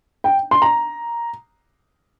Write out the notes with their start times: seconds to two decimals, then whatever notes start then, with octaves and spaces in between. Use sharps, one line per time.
0.24 G5
0.51 C6
0.62 A#5